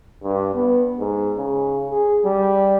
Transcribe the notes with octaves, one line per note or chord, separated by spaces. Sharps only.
G2
B3
G#2
C#3
G#4
G3